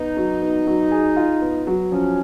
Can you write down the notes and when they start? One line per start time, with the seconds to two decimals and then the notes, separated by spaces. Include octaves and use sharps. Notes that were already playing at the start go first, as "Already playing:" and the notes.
Already playing: B3 D#4
0.17 F#3
0.42 B3
0.67 F#3
0.91 G#4
1.17 F4
1.42 B3
1.67 F#3
1.92 F3 C#4